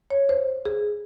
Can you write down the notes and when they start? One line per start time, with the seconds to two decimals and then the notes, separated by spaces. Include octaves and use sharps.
0.11 C#5
0.29 C5
0.66 G#4